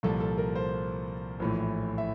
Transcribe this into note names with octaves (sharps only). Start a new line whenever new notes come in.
C2 A#2 F3 A4
A4
A#4
C5
A#1 A2 E3
E5